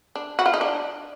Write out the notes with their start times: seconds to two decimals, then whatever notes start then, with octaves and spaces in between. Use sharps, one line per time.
0.15 D4
0.39 F#4
0.46 F4
0.54 D#4
0.61 D4